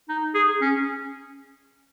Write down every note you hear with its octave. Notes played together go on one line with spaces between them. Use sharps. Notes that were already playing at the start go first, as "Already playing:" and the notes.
D#4
G#4
C#4